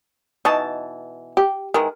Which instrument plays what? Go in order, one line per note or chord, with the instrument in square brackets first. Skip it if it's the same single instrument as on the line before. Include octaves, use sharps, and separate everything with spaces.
[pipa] B2 E3 A5 [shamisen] D#4
[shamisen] G4
[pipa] D#3 E3 G#3 [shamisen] A#4